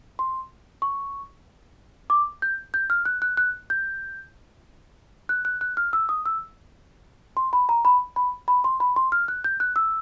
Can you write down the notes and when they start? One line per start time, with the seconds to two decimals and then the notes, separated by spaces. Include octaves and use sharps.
0.19 C6
0.82 C#6
2.10 D6
2.42 G6
2.74 G6
2.90 F6
3.05 F#6
3.22 F#6
3.37 F#6
3.70 G6
5.29 F#6
5.45 F#6
5.61 F#6
5.77 F6
5.93 E6
6.09 D#6
6.26 E6
7.37 C6
7.53 B5
7.69 A#5
7.85 B5
8.16 B5
8.48 B5
8.64 C6
8.80 B5
8.96 C6
9.12 F6
9.28 F#6
9.44 G6
9.60 F#6
9.76 E6